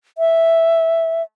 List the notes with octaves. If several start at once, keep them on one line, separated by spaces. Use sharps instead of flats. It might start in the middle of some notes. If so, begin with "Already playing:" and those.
E5